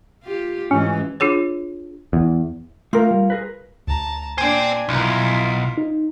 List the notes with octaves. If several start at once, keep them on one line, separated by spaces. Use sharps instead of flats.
F4 G4
G#2 E3 G#3 C#4
D4 F4 G#4 C#5
E2
A3 F4 A#4
G3
G#4 A#4 B4
D2 A5 A#5
A#2 D4 C5 G5 G#5 G#6 D#7
B1 E4 F4 A#4
D#4